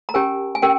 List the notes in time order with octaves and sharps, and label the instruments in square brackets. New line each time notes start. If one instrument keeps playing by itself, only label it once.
[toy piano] A#5
C#4 G4 A#4 G#5
G#5
C#4 G4 A#4 G5